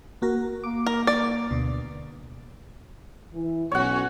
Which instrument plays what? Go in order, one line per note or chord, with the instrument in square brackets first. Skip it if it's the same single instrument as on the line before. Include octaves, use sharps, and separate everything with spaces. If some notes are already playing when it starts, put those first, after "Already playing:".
[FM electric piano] A#3 F#4 A#4
[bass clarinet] A#3 [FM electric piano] D6
[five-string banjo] A#4
D5
[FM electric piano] D2 B2
[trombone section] E3
[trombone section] B1 [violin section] C#4 F#4 [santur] C#5 F#5